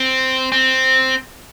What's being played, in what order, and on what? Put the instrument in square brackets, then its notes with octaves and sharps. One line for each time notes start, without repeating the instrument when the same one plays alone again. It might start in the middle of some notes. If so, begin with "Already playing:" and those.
Already playing: [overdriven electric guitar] C4
C4